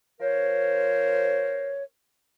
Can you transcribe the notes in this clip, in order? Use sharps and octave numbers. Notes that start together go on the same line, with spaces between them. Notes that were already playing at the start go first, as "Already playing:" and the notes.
F3 A#4 C5 C#5